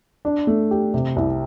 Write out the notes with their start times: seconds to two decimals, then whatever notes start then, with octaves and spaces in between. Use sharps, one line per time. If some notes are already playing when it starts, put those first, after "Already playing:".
0.25 D4
0.47 A3
0.71 G4
0.94 C3
1.16 C2